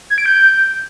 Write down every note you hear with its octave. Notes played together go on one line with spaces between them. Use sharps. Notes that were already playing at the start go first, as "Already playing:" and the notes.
G#6
D7
G6